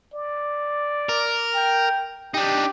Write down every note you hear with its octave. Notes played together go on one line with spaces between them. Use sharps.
D5
A#4
G5
D4 D#4 G4